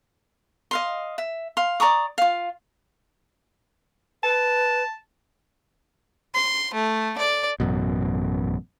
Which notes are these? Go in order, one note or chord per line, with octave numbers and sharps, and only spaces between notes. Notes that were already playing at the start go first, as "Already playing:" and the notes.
D#5 F5 C6
E5
F5 C6
D5 A#5 C#6 D#6
F4 F5
B4 A5
C6
A3
D5
A1 F#2 B2